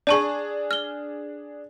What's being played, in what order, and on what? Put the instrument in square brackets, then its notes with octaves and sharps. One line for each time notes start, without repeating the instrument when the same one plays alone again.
[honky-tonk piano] D4 G#4 [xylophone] D5 A5 C#6
[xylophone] F6 G7